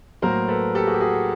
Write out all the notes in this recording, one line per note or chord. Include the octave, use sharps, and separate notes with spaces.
A2 F#3 A#3 A#4 C5
A4 B4
G4 A4
F#4 G#4
G4
F#4 G#4